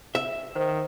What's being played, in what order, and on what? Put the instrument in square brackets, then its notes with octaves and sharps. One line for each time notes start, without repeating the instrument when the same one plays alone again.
[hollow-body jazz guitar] E5
[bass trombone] D#3 [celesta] C5